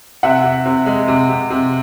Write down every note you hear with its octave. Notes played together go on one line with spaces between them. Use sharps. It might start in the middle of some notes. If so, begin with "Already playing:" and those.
C3 E5 F#5
C3
C3
G#3
C3
C3
C3